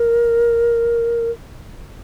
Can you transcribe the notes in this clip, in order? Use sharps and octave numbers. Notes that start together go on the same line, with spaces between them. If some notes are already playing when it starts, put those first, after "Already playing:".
Already playing: A#4